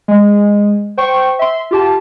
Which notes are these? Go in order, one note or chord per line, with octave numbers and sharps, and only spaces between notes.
G#3
C5 G5 C#6
E5 C6
F4 G4 A5